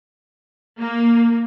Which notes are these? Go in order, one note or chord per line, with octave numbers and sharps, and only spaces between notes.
A#3